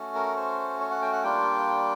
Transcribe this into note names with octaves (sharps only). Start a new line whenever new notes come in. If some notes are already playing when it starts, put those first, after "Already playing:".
Already playing: A3 C#4 F#4
A#4
C5
C#5
F#5
G5
F#5
G3 A#3 D4 F4 G5